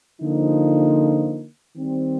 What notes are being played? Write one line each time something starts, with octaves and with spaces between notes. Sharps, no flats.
D3 F3 A#3 D#4
D#3 G3 C4